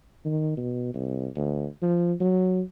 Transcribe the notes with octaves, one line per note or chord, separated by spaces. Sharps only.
D#3
B2
C2
D2
F3
F#3